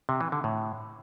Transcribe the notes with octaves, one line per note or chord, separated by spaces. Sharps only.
C3
E3
D3
A2